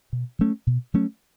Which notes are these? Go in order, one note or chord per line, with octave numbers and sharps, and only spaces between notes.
B2
F#3 A3 C#4
B2
F#3 A3 C#4